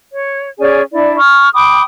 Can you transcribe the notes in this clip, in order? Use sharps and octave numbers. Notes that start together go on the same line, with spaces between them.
C#5
C#4 G#4 D5 G#5
D4 E4 D5
C#6 F6
G5 B5 D6 D#6